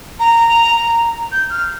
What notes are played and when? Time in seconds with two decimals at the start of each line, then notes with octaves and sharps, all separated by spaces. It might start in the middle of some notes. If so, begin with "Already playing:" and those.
0.19 A#5
1.32 G6
1.50 F6